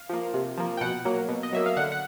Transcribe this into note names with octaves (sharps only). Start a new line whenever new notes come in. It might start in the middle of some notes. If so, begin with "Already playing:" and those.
Already playing: F5
F3 A#3
C3
F3 A#3
G5
B2 F#5
F#3 A#3
B2
D#5
F#3 A#3 E5
F5
D3 F#5
F#5